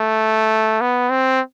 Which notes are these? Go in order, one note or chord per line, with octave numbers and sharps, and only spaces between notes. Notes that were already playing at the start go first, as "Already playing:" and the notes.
Already playing: A3
B3
C4